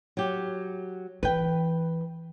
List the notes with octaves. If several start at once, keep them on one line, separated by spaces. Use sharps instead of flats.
F#3 G4
E3 B4 G5